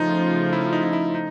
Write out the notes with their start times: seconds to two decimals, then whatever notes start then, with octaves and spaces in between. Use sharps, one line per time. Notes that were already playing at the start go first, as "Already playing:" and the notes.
Already playing: C#3 F3 A3 D#4
0.53 E4
0.73 D#4
0.84 D#4
0.93 E4
1.15 D#4